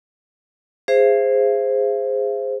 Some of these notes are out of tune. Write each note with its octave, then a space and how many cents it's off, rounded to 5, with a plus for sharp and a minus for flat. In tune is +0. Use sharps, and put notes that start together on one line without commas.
G#4 -15 C5 +0 E5 +45